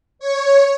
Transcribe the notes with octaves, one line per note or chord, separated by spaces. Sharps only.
C#5